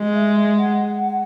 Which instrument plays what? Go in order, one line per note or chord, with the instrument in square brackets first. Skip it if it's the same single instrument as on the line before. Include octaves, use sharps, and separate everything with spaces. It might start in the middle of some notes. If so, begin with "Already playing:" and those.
Already playing: [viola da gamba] G#3
[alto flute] E5
F#5